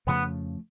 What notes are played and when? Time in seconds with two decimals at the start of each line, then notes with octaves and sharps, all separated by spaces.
0.07 F2 C#3 F3 A3 B3